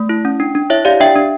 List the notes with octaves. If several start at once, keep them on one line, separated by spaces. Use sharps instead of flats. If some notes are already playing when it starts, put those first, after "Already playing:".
Already playing: A3
E4
C#4
D4
D4
E4 C#5 E5
G4 D5 F5
D4 E5 G5
D4